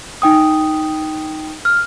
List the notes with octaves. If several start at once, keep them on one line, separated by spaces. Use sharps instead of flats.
D#4 G5 D#6
F6